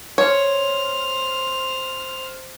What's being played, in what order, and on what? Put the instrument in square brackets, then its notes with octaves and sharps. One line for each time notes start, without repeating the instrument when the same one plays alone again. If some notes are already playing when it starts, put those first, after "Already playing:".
[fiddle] C5 F6 [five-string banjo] C#5